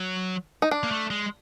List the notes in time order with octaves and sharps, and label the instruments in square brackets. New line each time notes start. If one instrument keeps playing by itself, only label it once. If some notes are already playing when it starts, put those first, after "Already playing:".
Already playing: [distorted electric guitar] F#3
[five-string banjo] D#4
D4
[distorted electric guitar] A#3
A3
G#3